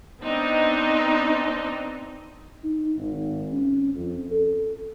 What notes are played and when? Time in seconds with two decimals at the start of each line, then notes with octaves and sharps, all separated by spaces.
0.21 B3 C4 D4 D#4 D#5
2.64 D#4
2.96 G#1
3.53 C#4
3.95 F2
4.30 A4